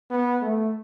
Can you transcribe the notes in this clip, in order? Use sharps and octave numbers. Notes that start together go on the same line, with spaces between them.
B3
A3